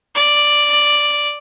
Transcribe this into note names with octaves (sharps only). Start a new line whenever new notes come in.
D5